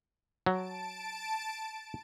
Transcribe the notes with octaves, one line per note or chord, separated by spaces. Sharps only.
F#3 A5 D7